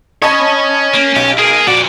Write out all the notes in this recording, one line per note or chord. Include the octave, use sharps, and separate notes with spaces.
C#4 C#5 D#5 A5 B5
A#3
B1 G4
A#3 G#4
F2 A#2 F#4 D5